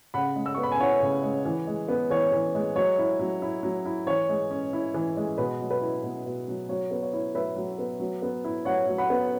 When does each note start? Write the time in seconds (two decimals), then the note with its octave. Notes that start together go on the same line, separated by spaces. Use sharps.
0.14 C#3 F#5 B5
0.36 G#3
0.46 E6
0.55 B3 C#6
0.63 B5
0.72 G#5
0.79 E4 C#5 F#5
1.02 C#3
1.23 G#3
1.46 E3
1.67 G#3
1.89 B3
2.10 E3 C#5
2.32 E3
2.55 G#3
2.76 F#3 C#5
2.99 E4
3.19 F#3
3.42 E4
3.63 F#3
3.85 E4
4.07 E3 C#5
4.29 G#3
4.51 C#4
4.73 E4
4.94 E3
5.17 G#3
5.38 B2 B4
5.60 F#3
5.70 B4
5.81 E4
6.03 B2
6.26 B2
6.48 F#3
6.69 F#3 C#5
6.91 B3
7.03 C#5
7.13 E4
7.35 F#3 B4 E5
7.56 F#3
7.78 B3
8.00 F#3
8.22 B3
8.44 E4
8.65 F#3 C#5 F#5
8.87 F#3
8.98 F#5 B5
9.10 B3